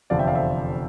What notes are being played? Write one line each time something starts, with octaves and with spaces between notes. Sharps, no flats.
F1 E2 D3 F3 D5 F5
E5 G5
D5 F5
C5 E5